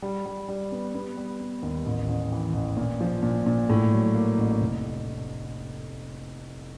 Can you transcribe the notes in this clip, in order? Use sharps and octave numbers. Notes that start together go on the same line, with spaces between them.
G3
G3
G3
B3
B3
G3
B3
D#2
A1
A1
E3
A1
A#2
F3
A#2
A#2
A2
F#3
A#3
A1
F1